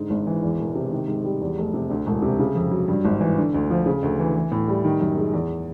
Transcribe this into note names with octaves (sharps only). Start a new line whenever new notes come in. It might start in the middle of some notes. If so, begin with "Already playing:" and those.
Already playing: G#2 D3
G#1
E3
E2
E1
C3
D#3
G#2
G3
E2
F1
C3
D2
E1
C3
C#3
F2
F#3
G2
G#1
E3
D3
D2
F3
C#3
D2
E3
E3
A2
G3
D#3
F#2
G#3
E2